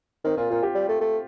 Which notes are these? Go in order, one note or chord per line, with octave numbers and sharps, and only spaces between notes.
D#3 C4
A#2 F4
A#2 F4
G4
G3
A3
A3